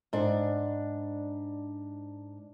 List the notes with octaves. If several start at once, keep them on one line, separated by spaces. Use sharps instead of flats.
G#2 D4